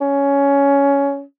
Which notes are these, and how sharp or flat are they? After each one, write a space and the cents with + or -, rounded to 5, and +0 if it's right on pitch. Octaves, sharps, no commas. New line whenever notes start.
C#4 +15